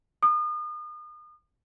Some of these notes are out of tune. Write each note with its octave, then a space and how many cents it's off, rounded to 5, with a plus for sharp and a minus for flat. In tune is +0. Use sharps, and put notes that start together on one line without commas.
D#6 -35